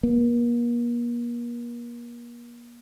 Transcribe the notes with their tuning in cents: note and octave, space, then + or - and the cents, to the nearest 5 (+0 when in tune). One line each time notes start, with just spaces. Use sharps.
A#3 +40